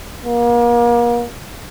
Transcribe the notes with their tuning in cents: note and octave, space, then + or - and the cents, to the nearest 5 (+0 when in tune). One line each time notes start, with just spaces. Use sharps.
A#3 +35